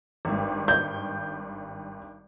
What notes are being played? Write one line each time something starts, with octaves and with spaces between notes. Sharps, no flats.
G#1 G2
G6